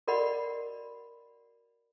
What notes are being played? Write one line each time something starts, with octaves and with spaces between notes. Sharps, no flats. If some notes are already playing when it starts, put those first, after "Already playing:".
F#4 A#4 D5 D#5 F#5 B5